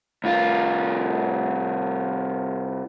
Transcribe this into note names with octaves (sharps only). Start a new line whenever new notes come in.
C2 F4